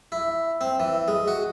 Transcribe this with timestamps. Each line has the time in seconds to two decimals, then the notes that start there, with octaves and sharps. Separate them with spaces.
0.12 E4
0.61 C4
0.80 E3
1.08 G#3
1.28 F#4